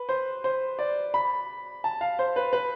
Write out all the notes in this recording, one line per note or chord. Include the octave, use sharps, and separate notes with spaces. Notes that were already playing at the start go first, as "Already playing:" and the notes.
Already playing: B4
C5
C5
D5
B5
A5
F5
C5
B4
B4